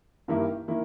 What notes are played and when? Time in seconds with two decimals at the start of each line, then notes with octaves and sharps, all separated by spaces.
0.28 G2 D#3 A#3 E4 G4
0.68 D#3 A#3 E4